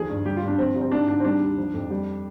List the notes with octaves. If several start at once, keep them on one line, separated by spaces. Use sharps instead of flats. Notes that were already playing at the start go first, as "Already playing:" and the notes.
Already playing: D#2 F3 G#4
G2
G3 G4
F4
G2
D4
F3 C4
C2
C4
G#2 D4
G#2 D4
C4
G3 D4
D#2
F3
F2
G3